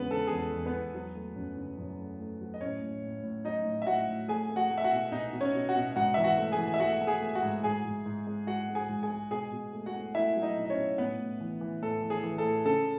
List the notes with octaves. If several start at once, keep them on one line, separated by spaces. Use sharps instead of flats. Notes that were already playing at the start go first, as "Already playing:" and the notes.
Already playing: E2 C#3 G#3 B3 B4
C#3 A4
E2 G#4
A4
E2
B3 B4
E2
F#3
A3
F#2
C#3
F#2
A3
A3
F#3
D#5
A2 C#4 C#5
A2
A2
A2
F#3 D#4 D#5
A2
E5
A2 F#4 F#5
A2
A3 G#4 G#5
A3
F#4 F#5
A3
E5
F#4 F#5
B2
B2 D#4 D#5
B2
C#4 C#5
B2
F#4 F#5
B2
G#2 F#4 F#5
E3 E5
F#4 F#5
A3
G#4 G#5
E3
E5
A3 F#4 F#5
A3
G#4 G#5
A3
F#4 F#5
G#2
G#2 G#4 G#5
G#2
G#2
G#3
G#3 F#4 F#5
G#3
G#4 G#5
G#2
G#4 G#5
G#3
B2 G#4 G#5
B2
A3
F#4 F#5
A3
A3 E4 E5
F#3
D#4 D#5
B2
D#5
C#4 C#5
B2
A2 B3 B4
A2
E3
E3
A2 A4
E3
G#4
E3
A4
A2
C#3 A4